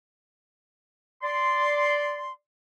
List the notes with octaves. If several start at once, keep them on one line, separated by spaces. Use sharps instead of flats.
D5 C6